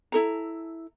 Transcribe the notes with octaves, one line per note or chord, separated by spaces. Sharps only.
E4 A4 A#5